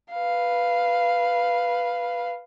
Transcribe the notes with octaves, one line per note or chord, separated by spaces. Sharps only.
B4 F5